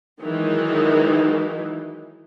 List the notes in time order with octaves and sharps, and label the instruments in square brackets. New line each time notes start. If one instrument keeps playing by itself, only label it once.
[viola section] D#3 E3 F#3 G#3 D#4